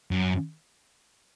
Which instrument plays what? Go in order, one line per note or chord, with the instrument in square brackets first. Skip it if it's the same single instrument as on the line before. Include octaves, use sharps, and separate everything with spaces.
[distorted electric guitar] F#2